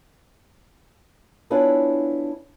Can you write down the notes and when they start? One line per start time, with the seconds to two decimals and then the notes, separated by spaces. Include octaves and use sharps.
1.50 B3 D4 E4 F4 C#5 G#5